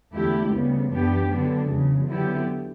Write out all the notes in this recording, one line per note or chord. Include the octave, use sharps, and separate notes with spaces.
E2 D3 A3 E4 G4
D2 C#3 G3 B3
F#2 E3 B3 D4 G4
D3 F#3 B3 D4
E2 C#3 F#3
D3 F#3 B3 E4 G4